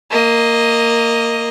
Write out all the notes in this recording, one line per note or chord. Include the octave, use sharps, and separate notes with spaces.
A#3 D#5